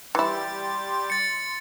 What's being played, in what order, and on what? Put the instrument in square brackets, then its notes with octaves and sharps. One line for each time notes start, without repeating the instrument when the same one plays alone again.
[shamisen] E3 E4 [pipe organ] G3 G4 A6 [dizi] C6
[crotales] A6 C#7